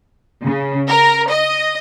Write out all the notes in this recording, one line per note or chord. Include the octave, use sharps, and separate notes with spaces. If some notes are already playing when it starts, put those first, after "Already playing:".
C#3
A#4
D#5